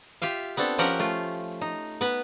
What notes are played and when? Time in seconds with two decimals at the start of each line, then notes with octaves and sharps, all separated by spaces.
0.22 F4 G4 E5 F5
0.57 B3 C4 D4 A4
0.78 F3 C#4 G4 A#4 F#5
0.99 A3 F4
1.61 D#4
2.01 B3 B4